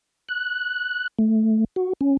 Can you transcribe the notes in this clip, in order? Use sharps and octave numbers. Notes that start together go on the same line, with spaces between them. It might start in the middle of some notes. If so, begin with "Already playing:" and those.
F#6
A3
F#4
C#4